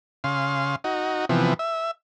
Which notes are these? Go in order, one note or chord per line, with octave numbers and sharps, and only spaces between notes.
C#3 F5 C6
D#4 F#4
C3 E3 F3 B3
E5